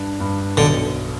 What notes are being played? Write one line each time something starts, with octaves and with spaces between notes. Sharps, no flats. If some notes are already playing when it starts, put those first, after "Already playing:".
Already playing: G2 D4
G2
B1 D3